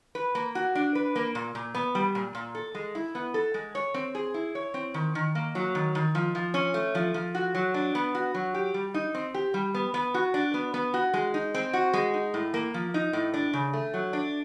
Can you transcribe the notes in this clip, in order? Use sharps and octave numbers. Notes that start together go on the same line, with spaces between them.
B4
A#3
F#4
D4
B4
A#3
A#2
A#2
B3
G3
A#2
A#2
A4
G#3
E4
B3
A4
G#3
C#5
C4
G#4
E4
C#5
C4
D#3
D#3
A#3
F#3
D#3
D#3
F3
F3
C#4
A3
F3
F3
F#4
F#3
D4
B3
F#4
F#3
G4
G3
D#4
C4
G4
G3
B3
B3
F#4
D4
B3
B3
F#4
G#3
D#4
C4
F#4
G#3
D#4
A2
A#3
F3
D#4
A2
D4
C#3
A3
F#3
D4